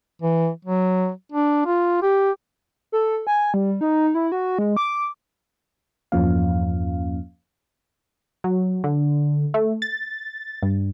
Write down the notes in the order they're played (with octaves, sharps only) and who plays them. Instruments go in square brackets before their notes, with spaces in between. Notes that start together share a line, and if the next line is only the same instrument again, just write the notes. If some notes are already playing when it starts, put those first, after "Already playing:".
[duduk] E3
F#3
D4
F4
G4
[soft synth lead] A4
G#5
G3
D#4
E4
F#4
G#3
D6
[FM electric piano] E2 G2 F3 A#3 C#4 F5
[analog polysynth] F#3
D3
A3
A6
G2